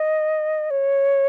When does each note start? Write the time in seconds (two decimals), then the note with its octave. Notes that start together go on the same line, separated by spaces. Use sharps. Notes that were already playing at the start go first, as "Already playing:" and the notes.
Already playing: D#5
0.70 C#5